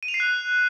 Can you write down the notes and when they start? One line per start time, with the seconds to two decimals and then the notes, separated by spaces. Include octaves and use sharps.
0.03 D#7
0.08 F7
0.14 C7
0.20 F#6